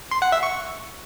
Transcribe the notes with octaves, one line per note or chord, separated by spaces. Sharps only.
C6
F#5
E5
C#6